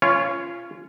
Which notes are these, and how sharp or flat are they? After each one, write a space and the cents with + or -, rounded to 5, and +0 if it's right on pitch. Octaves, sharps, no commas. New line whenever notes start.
C#4 +5 F4 -20 C#5 +0